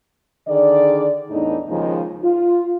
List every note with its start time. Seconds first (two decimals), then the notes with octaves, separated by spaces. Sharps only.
0.48 D3 D#3 G#4 D5
1.30 E2 A2 E3 D4 D#4
1.68 D#2 C#3 F3 G#3 D#4
2.23 F4